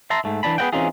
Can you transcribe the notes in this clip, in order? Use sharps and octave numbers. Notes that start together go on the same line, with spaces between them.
E5 A5 A#5 C6
G#2 A3
E3 C#4 D4 A5 B5
B3 G#4 B4 D#5 F#5 G5
E3 C4 C#4 D#4 F4 G#4